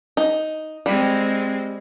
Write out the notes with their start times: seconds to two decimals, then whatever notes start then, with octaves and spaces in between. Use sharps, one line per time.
0.17 D#4
0.86 G3 G#3 C4